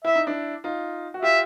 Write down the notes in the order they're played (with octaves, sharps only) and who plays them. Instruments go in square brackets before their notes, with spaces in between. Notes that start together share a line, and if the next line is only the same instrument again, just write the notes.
[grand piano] E4 [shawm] E5
[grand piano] D#4
D4 E4
D#4 F4
F#4
[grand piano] F4 G4 [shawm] E5